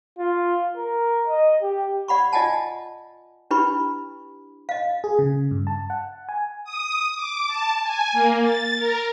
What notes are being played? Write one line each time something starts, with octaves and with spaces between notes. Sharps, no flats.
F4
A#4
D#5
G4
D5 F#5 B5 C#6
F4 D5 D#5 F#5 G#5 A5
D4 E4 G4 B4 B5 C#6
D#5 F5
G#4
C#3
G2
A5
F#5
G#5
D#6
D6
A5
G#5
A#3
A6
A#4